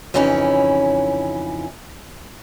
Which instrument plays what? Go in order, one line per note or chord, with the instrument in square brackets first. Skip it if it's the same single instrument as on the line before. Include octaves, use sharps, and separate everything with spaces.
[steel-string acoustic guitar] F2 C#3 E3 C#4 D#4 E4